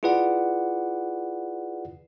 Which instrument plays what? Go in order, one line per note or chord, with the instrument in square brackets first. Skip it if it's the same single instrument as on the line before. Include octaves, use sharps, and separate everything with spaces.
[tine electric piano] E4 F4 G#4 B4 D5 F#5